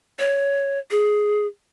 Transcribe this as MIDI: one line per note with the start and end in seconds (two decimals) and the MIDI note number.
0.19 0.79 73
0.91 1.46 68